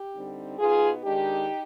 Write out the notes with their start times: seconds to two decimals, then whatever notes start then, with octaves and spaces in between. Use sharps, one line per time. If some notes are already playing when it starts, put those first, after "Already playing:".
Already playing: G4
0.14 D3 G3 C4 D#4
0.58 B2 B3 D#4 F4 G#4
1.04 D#3 G#3 D4 D#4 G4